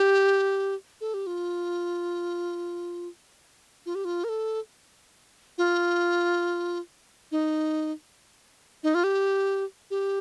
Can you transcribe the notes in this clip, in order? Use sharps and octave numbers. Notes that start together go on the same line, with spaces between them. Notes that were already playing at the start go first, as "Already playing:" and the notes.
Already playing: G4
A4
G4
F4
F4
G4
F4
A#4
A4
F4
D#4
D#4
F4
G4
G4